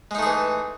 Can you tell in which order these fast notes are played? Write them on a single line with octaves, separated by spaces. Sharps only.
G#3 D#4 A3 G#4 E3